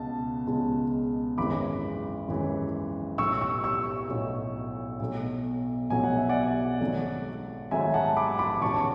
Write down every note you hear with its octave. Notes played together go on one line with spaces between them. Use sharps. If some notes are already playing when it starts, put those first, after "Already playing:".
Already playing: C#2 B2 G#3 A5
C#2 B2 G#3
G#1 F#2 E3 G#3 B5 D6
G#1 F#2 E3 G#3
B1 A2 F#3 C#6 E6
C#6 E6
C#6 E6
B1 A2 F#3
B1 B2 F#3 A3
B1 B2 F#3 A3 G#5
F#5
E5
D5 F#5
G#1 G#2 F#3 A3
G#1 G#2 F#3 A3 E5 G#5
F#5 A5
B5 D6
B5 D6
E1 E2 C#3 F#3 A5 C#6